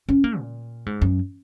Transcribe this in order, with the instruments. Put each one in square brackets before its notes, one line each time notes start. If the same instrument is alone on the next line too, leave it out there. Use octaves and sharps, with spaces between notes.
[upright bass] C#4
A#3
A#2
G#2
F#2